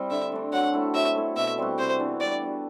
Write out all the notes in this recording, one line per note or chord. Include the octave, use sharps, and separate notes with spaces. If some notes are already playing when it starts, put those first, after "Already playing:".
Already playing: G3 C4 E4
D3 E5
A3 D4
F#3 F#5
A3 E4 A4
F#3 E5
A3 E4
B2 E5
G3 C4 F#4
C3 C5
E3 B3 D4
G3 D5
B3 F#4